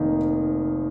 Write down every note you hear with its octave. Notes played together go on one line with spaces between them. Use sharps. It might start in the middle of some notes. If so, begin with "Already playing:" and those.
Already playing: F1 F2 D#3 A#3